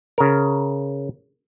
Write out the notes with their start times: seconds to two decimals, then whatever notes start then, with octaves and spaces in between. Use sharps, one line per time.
0.18 C#3 A#4